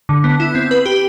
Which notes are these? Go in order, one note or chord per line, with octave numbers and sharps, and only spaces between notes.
D3
B3
E4
C4
B4
G4